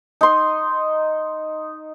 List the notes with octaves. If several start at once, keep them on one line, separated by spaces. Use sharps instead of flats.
D#4 C6